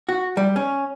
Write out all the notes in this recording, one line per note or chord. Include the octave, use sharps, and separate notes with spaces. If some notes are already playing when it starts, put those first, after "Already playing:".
F#4
G3
C#4